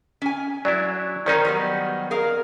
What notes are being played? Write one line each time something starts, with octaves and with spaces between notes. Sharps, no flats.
C#4 G#5
F#3 D4 E4 D5
D#3 C#4 D#4 A#4 C5 D5 A#5
F#3 G3 B3
G#4 A#4 F5